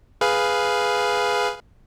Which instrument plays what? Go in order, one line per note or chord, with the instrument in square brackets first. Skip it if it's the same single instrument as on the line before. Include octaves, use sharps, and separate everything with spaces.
[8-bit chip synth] G#4 B4 F5